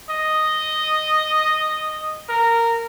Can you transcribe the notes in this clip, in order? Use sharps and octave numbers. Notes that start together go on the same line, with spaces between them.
D#5
A#4